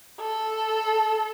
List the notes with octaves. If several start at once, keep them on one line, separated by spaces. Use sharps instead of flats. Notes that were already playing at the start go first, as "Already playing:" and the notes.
A4